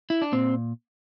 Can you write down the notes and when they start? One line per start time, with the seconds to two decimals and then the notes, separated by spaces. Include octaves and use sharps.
0.10 E4
0.22 D4
0.32 A#2 C4